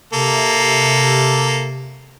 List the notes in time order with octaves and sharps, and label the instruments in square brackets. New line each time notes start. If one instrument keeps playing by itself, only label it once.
[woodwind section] C3 [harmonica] A#3 A4